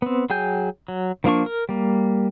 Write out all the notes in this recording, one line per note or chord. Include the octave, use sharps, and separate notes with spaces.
B3 C4
F#3 G#4 G5 G#5 G6
F#3
D#3 F3 A#3 D4 C#6
A#4
G3 A#3